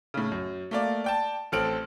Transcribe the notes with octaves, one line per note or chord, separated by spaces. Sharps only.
A2 C#3
F#2
A3 A#3 D5
D5 G5 A5
A1 C4 A4 F6 D7 F#7